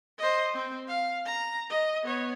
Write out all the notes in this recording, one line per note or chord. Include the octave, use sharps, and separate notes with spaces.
C5 D#5
C4
F5
A#5
D#5
B3 C#5